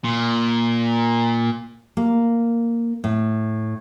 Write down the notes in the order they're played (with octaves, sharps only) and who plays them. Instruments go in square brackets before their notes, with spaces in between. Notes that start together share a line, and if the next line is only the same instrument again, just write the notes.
[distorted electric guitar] A#2
[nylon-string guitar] A#3
A2